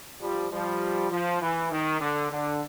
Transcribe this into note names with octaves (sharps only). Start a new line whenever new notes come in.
F3 G3
F3 G3
F3
E3
D#3
D3
D3